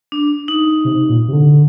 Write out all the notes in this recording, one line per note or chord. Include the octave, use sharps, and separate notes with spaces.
D4
D#4
C3
A#2
C3
D3